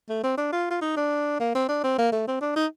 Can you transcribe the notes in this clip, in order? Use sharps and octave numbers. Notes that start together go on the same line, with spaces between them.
A3
C4
D4
F4
F4
D#4
D4
A#3
C4
D4
C4
A#3
A3
C4
D4
D#4